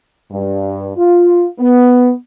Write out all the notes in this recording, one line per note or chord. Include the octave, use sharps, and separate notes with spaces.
G2
F4
B3